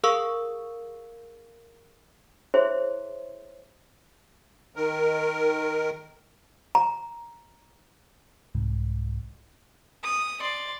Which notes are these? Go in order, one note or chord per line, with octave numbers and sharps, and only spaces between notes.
G#4 A#4 F5 C#6 E6
E4 G#4 C5 C#5 E5 C6
D#3 A#4
A#5
C2 G#2
D#6
D5 C6